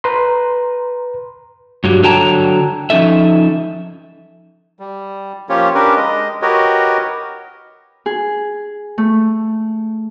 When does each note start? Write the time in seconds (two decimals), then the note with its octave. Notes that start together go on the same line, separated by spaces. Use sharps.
0.04 B4 A#5 C6
1.84 G2 F#3 G3
2.03 D3 F#3 C#5 G5 A5 A#5
2.90 F3 C#4 D#4 A4 E5
4.80 G3
5.49 F3 A#3 C#4 F4 G4 C#5
5.75 C#4 D4 G4 A#4 B4
5.96 G#3 D#5
6.42 F#4 G4 A#4 B4 C#5 D#5
8.06 G#4
8.98 A3